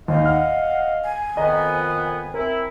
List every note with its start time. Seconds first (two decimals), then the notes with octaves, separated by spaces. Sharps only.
0.08 D#2 D#4 D#5 F5
0.26 F#5 F6
1.04 G#5
1.37 F2 D#3 B3 D#5 A#5
2.34 C4 E4 A#4